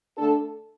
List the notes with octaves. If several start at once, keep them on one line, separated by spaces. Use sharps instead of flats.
D3 A3 D4 A4